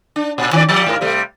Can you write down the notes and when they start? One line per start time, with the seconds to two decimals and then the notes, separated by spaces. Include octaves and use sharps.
0.16 D4
0.38 A#2
0.53 D#3 C#4 D5
0.69 F3 G3 D5
0.86 G#2 A#4
1.01 C3 G3 A3